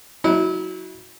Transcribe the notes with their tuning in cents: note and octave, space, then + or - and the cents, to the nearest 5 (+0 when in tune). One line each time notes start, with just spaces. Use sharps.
F#3 +0 E4 -30